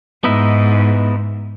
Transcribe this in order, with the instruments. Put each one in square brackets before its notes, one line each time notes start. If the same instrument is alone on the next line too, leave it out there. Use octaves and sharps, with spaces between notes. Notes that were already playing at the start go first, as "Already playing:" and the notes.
[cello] G#2 [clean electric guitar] B3 D#4 E4